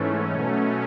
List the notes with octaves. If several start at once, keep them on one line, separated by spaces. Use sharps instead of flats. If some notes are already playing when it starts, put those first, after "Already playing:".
Already playing: G#2 E3 A3 C#4
B2 F#3 A3 C#4